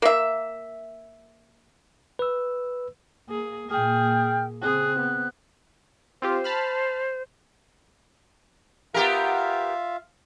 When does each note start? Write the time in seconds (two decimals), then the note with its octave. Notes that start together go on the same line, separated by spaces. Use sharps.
0.02 A#3 E5
2.19 B4 E6
3.30 A#3 G#4
3.70 A#2 A#3 G#4 G5 F6
4.62 C#3 C4 G#4 F#6
5.00 B3
6.22 C4 F4 G4 C5
6.44 A5 B5 F6
8.94 B3 F4 G4 A#4 E5 F5